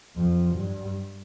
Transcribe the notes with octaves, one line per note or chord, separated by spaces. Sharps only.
F2
G2